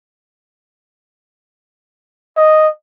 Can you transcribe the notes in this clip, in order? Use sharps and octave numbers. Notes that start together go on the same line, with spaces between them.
D#5